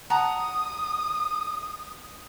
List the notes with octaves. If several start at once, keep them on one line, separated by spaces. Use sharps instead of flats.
F#5 A5 A#5 D#6